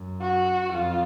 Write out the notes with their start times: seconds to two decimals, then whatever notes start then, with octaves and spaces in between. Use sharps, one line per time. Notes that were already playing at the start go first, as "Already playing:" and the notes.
Already playing: F#2
0.21 F#4
0.72 F2 F4